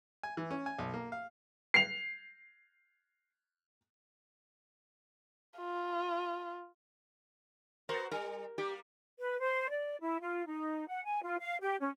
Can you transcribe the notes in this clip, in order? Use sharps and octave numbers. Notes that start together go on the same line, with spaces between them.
G#5
E3
C#4
G#5
B1
A#3
F5
C7 F7
F4
B3 F#4 A#4 C5
G3 A#4
G3 A#3 G4
B4
C5
D5
E4
F4
D#4
F#5
G#5
F4
F5
G4
C#4